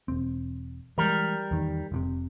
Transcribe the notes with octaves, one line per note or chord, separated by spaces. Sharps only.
E1 C4
E3 G3 G#3 A#4
E2 D#3
F1 A2 C3